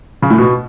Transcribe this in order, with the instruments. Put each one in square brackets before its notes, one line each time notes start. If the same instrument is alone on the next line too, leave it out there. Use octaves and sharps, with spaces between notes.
[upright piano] C#3
A2
B2